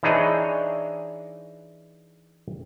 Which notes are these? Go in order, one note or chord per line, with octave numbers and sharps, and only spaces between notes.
E3 D4 D#4 G#4 C#5 D#5